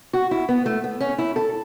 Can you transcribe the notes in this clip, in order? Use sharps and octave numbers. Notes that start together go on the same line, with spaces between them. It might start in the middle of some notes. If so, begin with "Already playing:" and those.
F#4
E4
B3
A3
B3
C#4
E4
A4